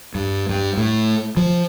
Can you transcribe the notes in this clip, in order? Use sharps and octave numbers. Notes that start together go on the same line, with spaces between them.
G2
G2
A2
F3